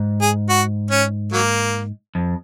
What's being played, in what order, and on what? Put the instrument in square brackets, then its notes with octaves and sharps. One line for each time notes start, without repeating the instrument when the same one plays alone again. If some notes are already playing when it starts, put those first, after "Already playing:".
Already playing: [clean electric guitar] G#2
[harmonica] G#4
F#4
C#4
F#3 A#3
[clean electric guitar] F2